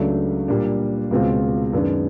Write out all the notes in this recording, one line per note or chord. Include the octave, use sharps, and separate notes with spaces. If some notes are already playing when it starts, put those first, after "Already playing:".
Already playing: C#2 C#3 F#3 A3 D4
A#2 G3 A#3 D4
C#2 B2 G#3 C4 F4
F#2 D#3 G#3 B3 D4